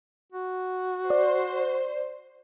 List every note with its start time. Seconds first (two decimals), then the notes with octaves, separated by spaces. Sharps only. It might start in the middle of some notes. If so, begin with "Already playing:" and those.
0.32 F#4
1.10 C5 D5